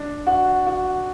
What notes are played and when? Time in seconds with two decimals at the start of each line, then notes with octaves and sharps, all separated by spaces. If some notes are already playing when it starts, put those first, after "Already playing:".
Already playing: D4
0.27 F#4
0.67 F#4